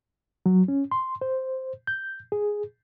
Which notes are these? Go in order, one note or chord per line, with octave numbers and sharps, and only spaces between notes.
F#3
C#4
C6
C5
G6
G#4